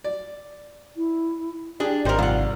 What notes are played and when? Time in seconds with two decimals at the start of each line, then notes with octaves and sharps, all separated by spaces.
0.04 D5
0.97 E4
1.80 D4 G4 G#4 D5
2.05 G#1 G3 A#4 C5 D#5
2.18 C2 F4 F#5